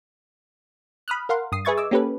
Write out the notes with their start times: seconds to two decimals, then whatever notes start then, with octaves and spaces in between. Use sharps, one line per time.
1.08 B5 D#6 F6 F#6
1.29 A#4 F5 F#5 C6
1.52 G2 D#6 C7
1.65 G#4 B4 E5 C#6 G#6 A6
1.77 D#5 D6 E6
1.91 A#3 C#4 G4 A4 B4